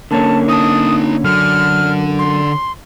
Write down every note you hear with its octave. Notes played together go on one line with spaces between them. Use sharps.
D3 A#3 C#4 A5
D#4 A5 D#6
F#2 D3 F6
C6